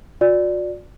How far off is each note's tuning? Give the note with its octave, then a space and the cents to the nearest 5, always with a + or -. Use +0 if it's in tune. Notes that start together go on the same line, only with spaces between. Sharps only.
F#4 -40 D5 +0